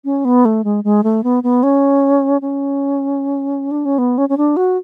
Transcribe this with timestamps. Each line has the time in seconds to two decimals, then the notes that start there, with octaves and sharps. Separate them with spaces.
0.05 C#4
0.25 B3
0.45 A3
0.64 G#3
0.84 G#3
1.04 A3
1.24 B3
1.43 B3
1.63 C#4
2.42 C#4
3.71 D4
3.85 C#4
3.98 B3
4.18 C#4
4.29 C#4
4.37 D4
4.57 F#4